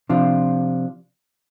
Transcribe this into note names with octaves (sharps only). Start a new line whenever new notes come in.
C3 F3 D4 F4